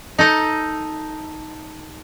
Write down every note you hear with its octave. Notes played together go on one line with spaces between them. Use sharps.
D#4 A4 D#5